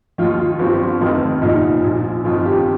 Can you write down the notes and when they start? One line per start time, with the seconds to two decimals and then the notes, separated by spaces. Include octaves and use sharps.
0.18 D#2 D#3 F4
0.39 F4
0.59 G1 G2 F3 C4
1.01 F1 F2 D#3
1.42 C2 A#2 F3 D#4
1.83 A#1 A#2 F3
2.24 G1 F2 D#3 F4
2.46 G4